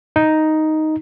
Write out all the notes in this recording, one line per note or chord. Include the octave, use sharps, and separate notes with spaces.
D#4